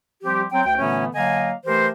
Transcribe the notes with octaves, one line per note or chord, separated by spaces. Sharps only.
F3 G3 C4 G4
F#3 C4 G5
D2 G5
A#2 D3 E3 A3 B3 C#4
D3 F#3 A#3 D#5 F5 G#5
E3 A3 G4 A#4 C5